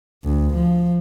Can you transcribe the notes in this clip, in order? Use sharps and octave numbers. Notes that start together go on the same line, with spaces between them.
D2
F3